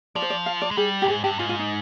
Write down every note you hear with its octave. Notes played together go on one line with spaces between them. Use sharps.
F3 D5
C5
D5
F5
D5
G#3
G3 G#4
A#2 G4
G#2 G#4
G2 G4
G#2 F4
F4
D#4